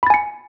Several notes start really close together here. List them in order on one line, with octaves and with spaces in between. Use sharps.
B5 A6 G#5 C#7